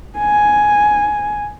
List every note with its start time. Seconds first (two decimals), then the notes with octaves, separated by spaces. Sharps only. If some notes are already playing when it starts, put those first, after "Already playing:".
0.19 G#5